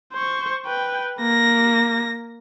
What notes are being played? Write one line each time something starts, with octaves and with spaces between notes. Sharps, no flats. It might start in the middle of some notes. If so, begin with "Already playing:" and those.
C5 C#6
B4 G5
A#3 A#6